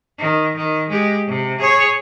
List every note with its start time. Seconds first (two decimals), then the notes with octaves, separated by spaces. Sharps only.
0.19 D#3
0.56 D#3
0.89 G#3 G4
1.27 C3
1.58 G#4 C#5